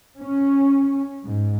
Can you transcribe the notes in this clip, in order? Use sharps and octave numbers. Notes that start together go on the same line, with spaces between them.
C#4
G#2